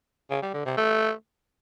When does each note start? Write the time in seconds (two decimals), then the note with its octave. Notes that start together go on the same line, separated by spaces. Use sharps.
0.31 C#3
0.42 G3
0.54 D3
0.65 C3
0.77 A3